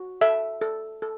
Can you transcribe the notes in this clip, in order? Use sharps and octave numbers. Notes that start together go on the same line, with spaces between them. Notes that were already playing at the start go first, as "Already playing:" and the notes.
Already playing: F#4
A4 E5
A4
A4